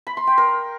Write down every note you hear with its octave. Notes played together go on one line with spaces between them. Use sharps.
B5
C6
G5
A#4